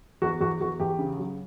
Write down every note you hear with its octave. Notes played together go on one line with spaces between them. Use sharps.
E2 F#4
E2 F#4
E2 F#4
E2 G4
C#3
F#3